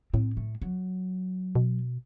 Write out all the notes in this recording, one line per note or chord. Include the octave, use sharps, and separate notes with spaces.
A2 C4
A3
F#3
B2